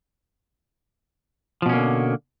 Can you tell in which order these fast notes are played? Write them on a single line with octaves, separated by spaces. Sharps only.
F3 B2 C#4 A#3 D3